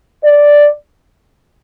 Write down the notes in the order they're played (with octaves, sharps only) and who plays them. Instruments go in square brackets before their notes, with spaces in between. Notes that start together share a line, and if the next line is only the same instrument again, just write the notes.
[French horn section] D5